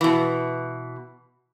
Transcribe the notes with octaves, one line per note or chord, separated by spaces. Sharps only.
B2 E3